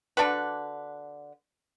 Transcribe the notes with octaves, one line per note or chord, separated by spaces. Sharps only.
D3 D4 F#4 B4